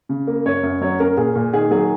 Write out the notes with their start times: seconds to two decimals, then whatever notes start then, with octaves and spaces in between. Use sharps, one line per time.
0.09 C#3
0.27 A#3
0.46 F#2 C#5
0.63 F#2
0.81 F#3 C#5
1.00 C#4 A#4
1.17 A#2 G#4
1.36 A#2
1.53 D#3 G#4
1.71 F#3 G#4